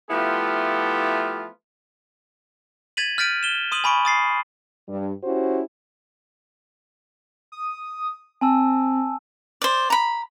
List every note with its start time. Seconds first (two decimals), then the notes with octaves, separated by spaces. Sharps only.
0.11 F3 A3 B3 E4 F4 G4
2.97 G#6 A6 B6 D#7 F7 F#7
3.18 F6 G6 A6 B6 D7 D#7
3.43 E7 G7
3.72 C6 D#6 D#7 F#7
3.84 G#5 B5 C#6 D7
4.05 D#6 A6 C7
4.88 G2
5.24 C#4 E4 F#4 G4 C5
7.52 D#6
8.41 C4 G#5 A5 E6
9.62 C5 D5
9.90 A#5 B5